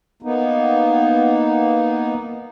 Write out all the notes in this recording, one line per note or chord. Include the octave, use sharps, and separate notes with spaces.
A#3 B3 D#4